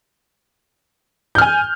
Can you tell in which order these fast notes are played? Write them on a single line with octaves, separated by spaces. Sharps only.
G6 F6 G#5